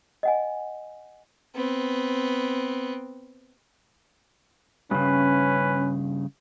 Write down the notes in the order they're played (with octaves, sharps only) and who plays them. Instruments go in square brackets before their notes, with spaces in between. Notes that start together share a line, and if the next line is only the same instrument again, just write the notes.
[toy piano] D#5 F#5 G#5
[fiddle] B3 C4
[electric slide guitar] G2 C#3 [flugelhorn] C#4 [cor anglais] B4